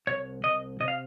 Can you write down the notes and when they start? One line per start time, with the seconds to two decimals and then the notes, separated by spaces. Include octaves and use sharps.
0.07 C2 C#5
0.44 C2 D#5
0.80 C3 D#5
0.88 F5